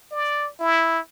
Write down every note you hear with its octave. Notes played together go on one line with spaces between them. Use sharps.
D5
E4